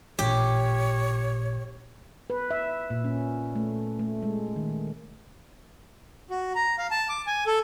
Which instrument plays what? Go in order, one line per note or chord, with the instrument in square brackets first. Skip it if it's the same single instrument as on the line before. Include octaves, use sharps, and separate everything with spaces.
[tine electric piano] A1 A#2 [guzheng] G4 [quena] C#5
[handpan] B4
E5
A#2
C#4
A3
A3
G#3
D#3
[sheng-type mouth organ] F#4
A#5
F5
A5
D6
G#5
A4